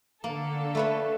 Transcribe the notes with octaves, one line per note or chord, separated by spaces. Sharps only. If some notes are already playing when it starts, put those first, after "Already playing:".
D3 A#3 A4
A3 B4 C#5